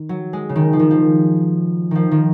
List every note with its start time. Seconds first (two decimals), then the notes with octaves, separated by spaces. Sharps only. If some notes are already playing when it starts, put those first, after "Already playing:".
Already playing: D#3
0.09 F#3
0.33 G#3
0.49 C#3
0.56 D#3
0.73 F3
0.79 D#3
0.91 F3
1.91 D#3 F3
2.11 D#3